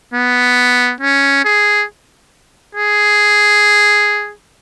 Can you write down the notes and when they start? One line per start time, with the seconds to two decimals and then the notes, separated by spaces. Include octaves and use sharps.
0.14 B3
1.01 C#4
1.45 G#4
2.75 G#4